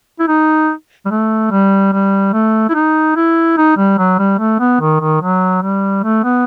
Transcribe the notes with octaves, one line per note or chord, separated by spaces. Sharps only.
E4
D#4
G3
A3
G3
G3
A3
E4
D#4
E4
D#4
G3
F#3
G3
A3
B3
D#3
D#3
F#3
G3
A3
B3